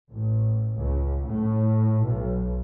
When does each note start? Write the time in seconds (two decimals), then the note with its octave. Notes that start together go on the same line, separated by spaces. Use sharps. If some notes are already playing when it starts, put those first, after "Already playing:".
0.11 A1
0.77 C#2
1.28 A2
2.04 B1